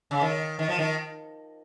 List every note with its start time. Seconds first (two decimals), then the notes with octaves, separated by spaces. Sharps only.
0.11 C#3
0.21 D#3
0.59 D#3
0.69 F3
0.79 D#3